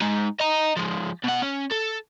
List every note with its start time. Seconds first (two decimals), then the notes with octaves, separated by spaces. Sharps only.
0.01 G#3 D#4
0.40 D#5 A#5
0.77 F3 G#3
1.24 B2 F#5
1.42 C#4
1.71 A4